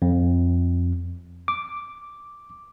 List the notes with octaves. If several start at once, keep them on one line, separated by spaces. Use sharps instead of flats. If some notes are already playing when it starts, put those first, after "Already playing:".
F2
D6